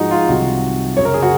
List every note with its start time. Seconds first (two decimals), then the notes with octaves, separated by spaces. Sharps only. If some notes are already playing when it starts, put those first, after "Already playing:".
Already playing: G#2 F3 D#4 F#4 G#4
0.11 F4
0.28 C2 C3 D#3 F#3 F#4
0.97 F#2 C#3 F#3 C#5
1.05 A#4
1.14 G#4
1.23 F#4